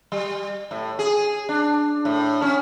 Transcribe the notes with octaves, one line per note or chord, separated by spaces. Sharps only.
G3
A2
G#4
D4
A2
C#4